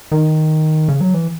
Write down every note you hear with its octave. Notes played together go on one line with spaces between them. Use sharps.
D#3
C#3
F#3
E3